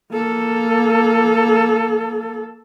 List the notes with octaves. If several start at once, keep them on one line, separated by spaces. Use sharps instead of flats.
A#3 A4